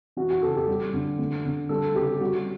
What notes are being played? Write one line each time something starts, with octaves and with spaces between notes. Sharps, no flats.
E3 F#4
F#4
C#3 A4
G4
G3
D3
A3
D3
G3 A4
C#3 G4
G3 F#4